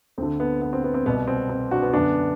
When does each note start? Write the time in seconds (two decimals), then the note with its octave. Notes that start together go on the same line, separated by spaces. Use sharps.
0.18 D2 C4
0.22 D3
0.40 B3
0.62 B3
0.73 C4
0.84 B3
0.94 C4
1.06 C2 B2 B3
1.28 C4
1.49 C4
1.71 D4 F#4
1.82 B3
1.93 F#2 D3 B3 D4